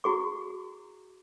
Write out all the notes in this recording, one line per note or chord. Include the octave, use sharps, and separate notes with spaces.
E4 F#4 G#4 C#6